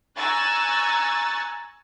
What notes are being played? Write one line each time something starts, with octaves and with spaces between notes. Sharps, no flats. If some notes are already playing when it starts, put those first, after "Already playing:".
G#5 A#5 C#6 E6 F#6 A6